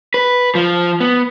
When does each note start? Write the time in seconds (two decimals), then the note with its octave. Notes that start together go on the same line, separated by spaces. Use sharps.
0.14 B4
0.55 F3
1.00 B3